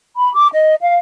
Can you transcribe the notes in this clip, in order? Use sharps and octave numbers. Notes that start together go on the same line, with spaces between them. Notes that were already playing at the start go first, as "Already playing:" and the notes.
B5
D6
D#5
F5